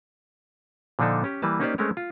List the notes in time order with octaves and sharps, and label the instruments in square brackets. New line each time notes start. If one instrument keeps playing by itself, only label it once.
[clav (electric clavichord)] A#2 D3 F3 D4 D#4 A4
C#4 G4
E3 G3 A#3 B4 A5
A#3 C#4 D#4 G4 C5 D5
G#3 A3 C4 C#4 A#4 C#5
F4